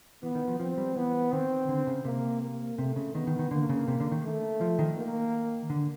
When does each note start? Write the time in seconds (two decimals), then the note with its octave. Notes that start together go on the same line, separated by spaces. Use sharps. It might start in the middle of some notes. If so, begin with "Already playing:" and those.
0.23 E3 B3
0.35 D#3
0.48 F3
0.60 F3 C4
0.77 G3
0.96 E3 B3
1.32 D#3 C4
1.69 D3
1.87 C#3
2.05 C3 A#3
2.42 A#3
2.78 C3 A3
2.96 C#3
3.15 D#3 B3
3.27 D#3
3.39 D#3
3.51 D3 A#3
3.69 C#3
3.88 C3
4.00 D3
4.12 D#3
4.24 A3
4.61 F3
4.79 D#3
4.97 A#3
5.70 D3